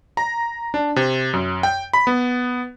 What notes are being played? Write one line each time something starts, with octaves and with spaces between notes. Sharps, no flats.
A#5
D4
C3
F#2
G5
B5
B3